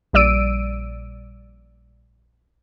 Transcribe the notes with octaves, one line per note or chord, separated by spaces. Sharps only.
A#1 G3 D5 E6 D7 D#7